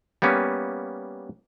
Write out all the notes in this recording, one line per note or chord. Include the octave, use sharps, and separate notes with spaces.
G3 A#3 B3 C#4